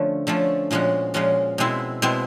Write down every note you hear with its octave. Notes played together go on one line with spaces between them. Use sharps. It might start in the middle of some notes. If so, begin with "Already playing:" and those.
Already playing: D3 F3 A3 C#4
D3 F3 A3 C#4
A#2 F3 G#3 C#4 F#4
A#2 F3 G#3 C#4 F#4
B2 G#3 C4 E4
B2 G#3 C4 E4